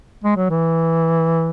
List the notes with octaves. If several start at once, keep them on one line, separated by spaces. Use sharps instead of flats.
G#3
F#3
E3